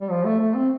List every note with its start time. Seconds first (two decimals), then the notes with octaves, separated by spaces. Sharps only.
0.01 G3
0.10 F3
0.25 A3
0.40 A3
0.55 C4